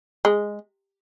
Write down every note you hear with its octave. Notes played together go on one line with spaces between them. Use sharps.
G#3